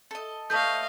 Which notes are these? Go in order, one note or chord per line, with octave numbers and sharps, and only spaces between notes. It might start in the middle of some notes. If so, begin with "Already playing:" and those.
A4 D#5
A3 B4 C#5 D#5 F5 A5 G6